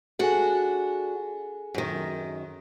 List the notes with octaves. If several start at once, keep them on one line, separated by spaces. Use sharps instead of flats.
D4 F#4 G#4 A4 G#5
F#2 D#3